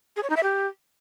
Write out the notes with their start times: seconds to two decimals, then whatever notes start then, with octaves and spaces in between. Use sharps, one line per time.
0.16 G#4
0.23 C#5
0.30 D#4
0.36 E5
0.43 G4